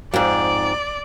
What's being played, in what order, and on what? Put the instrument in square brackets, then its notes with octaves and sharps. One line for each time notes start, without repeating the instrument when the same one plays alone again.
[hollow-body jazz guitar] F2 G#2 [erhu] D5